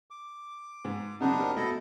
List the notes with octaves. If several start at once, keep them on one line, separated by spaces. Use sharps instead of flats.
D6
G#2
F#2 C#3 B3 D4 D#4
G4 A#4 C5
B2 A3 E4 F#4 A4 D#5